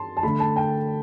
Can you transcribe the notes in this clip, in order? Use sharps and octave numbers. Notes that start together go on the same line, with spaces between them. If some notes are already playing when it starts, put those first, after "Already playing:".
Already playing: A5 C6
A5
D3 A3 B5
A5
G5